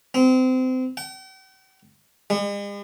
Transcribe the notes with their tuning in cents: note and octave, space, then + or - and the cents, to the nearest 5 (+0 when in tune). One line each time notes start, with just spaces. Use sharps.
C4 -25
G5 -45
G#3 -45